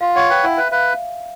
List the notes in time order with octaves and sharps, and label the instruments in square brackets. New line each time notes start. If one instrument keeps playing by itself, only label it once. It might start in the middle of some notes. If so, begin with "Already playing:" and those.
[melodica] F4 [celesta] F5
[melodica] C#5 [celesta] F#5
[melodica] B4 [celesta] G5
[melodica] E4 [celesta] F#5
[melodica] B4 [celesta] E5
[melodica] B4 [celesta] F5